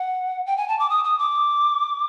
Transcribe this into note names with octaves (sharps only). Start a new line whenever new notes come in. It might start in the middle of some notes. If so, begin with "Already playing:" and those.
Already playing: F#5
G5
G#5
A5
D6
D#6
D#6
D6